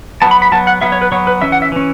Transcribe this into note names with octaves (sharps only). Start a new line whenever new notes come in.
F#3 B3 A5
B5
B5
F#3 B3 A5
F#5
F#3 B3 E5
C#5
B4
F#3 B3 C#5
B4
E3 C#4 E5
F#5
E5
E3 C#4